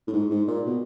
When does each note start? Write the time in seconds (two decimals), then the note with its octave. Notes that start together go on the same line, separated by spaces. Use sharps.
0.08 A2
0.13 G#2
0.30 G#2
0.47 A#2
0.66 B2